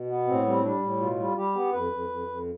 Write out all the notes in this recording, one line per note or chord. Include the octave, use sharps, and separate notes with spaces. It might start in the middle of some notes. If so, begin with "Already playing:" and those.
Already playing: B2
B3
A2 C4
G3 C4
G3 D4
A2
B2 F4
G3
G3 G4
B3
F2 B4
F2
F2
F2